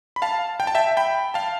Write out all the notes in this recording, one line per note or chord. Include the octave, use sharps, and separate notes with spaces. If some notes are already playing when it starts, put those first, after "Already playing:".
B5
F5 A5
G5
A5
E5 G5
G5 B5
F5 A5